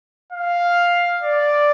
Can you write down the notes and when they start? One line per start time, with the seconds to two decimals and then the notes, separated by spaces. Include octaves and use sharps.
0.33 F5
1.22 D5